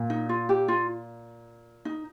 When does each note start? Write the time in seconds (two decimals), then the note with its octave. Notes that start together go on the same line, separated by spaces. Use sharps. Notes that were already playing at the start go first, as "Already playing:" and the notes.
Already playing: A#2
0.10 D#4
0.29 F4
0.49 G4
0.68 F4
1.85 D#4